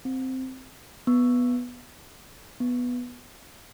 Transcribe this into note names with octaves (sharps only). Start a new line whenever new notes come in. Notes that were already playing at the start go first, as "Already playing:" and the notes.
C4
B3
B3